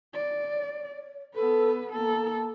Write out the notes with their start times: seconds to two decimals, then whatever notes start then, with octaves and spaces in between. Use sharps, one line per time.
0.14 D5
0.51 C#5
1.35 B3 A4 B4
1.92 A#3 A4